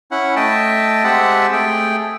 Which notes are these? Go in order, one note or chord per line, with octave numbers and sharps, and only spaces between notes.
C#4 E4 F#5
A3 D#5 E5 G5 A5
G#3 C4 G4 E5 F#5 A5
A3 G#4 G5